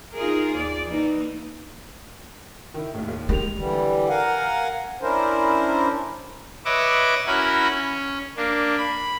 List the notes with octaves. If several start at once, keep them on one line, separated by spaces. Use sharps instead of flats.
D#4 F4 G#4 A#4
D#2 D5
E3 A#3 D#4
D#3 E4
D#2 A2
D#2
D#3 G#3 G4 F7
D3 E3 G3
A#4 F5 F#5 G#5
C#4 D4 E4 A#4 C5
B4 C#5 D#5 E5 D6
C#4 E4 F#4 A#4 B5
C#4
A#3 D4
B5